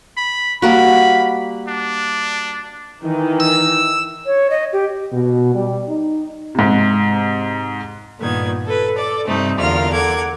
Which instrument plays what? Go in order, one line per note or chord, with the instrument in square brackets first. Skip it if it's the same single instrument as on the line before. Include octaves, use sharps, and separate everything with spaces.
[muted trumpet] B5
[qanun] G3 A#3 F#4 [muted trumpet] B5
[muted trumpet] D4
[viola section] D#3 E3 D#4
[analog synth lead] E6
[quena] C#5
D#5
G4
[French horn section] B2
G3
D#4
[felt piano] G#2 C3
[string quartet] G2 A#2 D#3 B3 G#6
A4 B4
A4 D5
G2 C3 G3 A3 C4 D#4
E2 D3 F4 A#4 F6
A4 A#4 F#5 D6 G#6